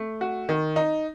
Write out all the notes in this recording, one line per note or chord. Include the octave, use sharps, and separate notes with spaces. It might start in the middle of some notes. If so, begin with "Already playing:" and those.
Already playing: A3
F#4
D#3
D#4